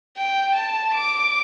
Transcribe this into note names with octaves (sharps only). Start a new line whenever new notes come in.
G5
A5
D6